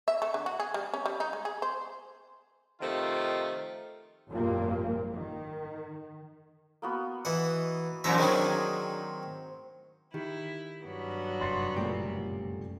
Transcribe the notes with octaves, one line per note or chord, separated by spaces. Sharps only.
E5
A3
D3
F#4
G#4
G3
C#4
G3
D#4
G#3
G#4
C5
C3 D#3 F3 A3 F4
G#1 F#2 A#2 F3 G3 A#3
D#3
A#3 B3 F#4
E3 D#5 F#5
F2 A#2 E3 C5 E5 A#5
D#3 F#3 C4 D4 D#4 G#4
D#3 E4 G4
G2 F#3 B3
F1 F#2 C6 A6 C7
C#2 A#2 G3 A3 A#3 G4